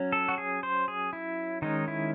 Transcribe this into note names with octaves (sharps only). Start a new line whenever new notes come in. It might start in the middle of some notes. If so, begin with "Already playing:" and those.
Already playing: F#3 C#4
A4
F#4
G#4
C5
G#4
E4
D#3 G#3 C#4 D#4
E4